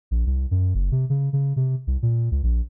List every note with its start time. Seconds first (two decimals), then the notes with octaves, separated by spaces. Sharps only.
0.11 A#1
0.26 C2
0.51 F#2
0.75 F#1
0.92 C3
1.10 C#3
1.33 C#3
1.56 C3
1.87 C2
2.02 A#2
2.31 C#2
2.43 A#1